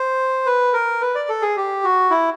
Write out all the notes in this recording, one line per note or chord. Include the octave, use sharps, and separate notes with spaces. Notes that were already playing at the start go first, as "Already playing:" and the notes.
Already playing: C5
B4
A#4
B4
D5
A4
G#4
G4
F#4
E4